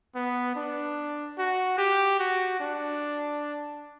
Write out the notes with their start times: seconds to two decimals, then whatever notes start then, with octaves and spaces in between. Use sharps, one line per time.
0.15 B3
0.56 D4
1.38 F#4
1.78 G4
2.20 F#4
2.61 D4